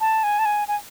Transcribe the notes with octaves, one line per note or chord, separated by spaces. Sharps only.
A5
G#5
A5
G#5
G#5